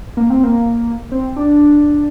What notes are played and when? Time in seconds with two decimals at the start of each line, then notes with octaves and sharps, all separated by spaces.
0.17 A#3
0.30 C4
0.44 A#3
1.12 C4
1.36 D4